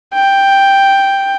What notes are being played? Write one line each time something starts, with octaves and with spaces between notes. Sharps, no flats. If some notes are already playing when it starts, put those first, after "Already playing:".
G5